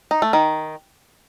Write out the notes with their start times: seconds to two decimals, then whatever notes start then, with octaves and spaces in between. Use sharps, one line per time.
0.11 D#4
0.22 A3
0.33 D#3